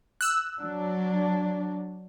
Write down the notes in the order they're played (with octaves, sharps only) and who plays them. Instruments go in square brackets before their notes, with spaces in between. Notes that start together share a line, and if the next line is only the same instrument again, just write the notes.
[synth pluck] E6 F#6
[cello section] F#3 D4